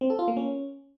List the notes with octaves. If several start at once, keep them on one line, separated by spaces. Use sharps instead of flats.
C4
A4
F4
A#3
C#4